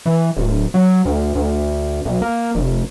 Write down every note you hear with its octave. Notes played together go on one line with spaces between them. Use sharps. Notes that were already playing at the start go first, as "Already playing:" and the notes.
E3
D1
F#3
D2
D2
B1
A#3
F1